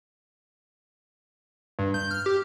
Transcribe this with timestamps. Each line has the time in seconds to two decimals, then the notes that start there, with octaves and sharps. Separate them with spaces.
1.79 G2
1.94 G6
2.11 F6
2.26 G4